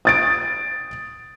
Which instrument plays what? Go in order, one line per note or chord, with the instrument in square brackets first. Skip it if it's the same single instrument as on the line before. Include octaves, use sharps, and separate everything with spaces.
[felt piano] D#6 A6 D7